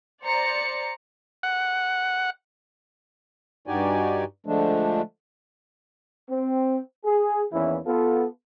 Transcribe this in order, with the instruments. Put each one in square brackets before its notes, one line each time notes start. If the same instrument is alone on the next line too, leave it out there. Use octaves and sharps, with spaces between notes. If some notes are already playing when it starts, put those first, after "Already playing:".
[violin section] C5 D5 A#5 C#7
[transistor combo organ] F#5
[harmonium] G2 D#4 F#4 G4 D5 G#5
D3 F3 G#3 A3 D4
[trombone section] C4
G#4
E2 D#3 E3 A#3 C#4 E4
B3 F4 A4